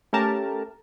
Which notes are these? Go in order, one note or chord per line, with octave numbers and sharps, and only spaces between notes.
A3 C#4 G4 A#4 A5